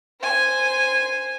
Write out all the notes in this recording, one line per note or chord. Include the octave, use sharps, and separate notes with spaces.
C5 G#5